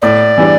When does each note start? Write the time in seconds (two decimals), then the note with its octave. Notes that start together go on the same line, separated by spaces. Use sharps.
0.02 A2 D5
0.38 E3 G3 D4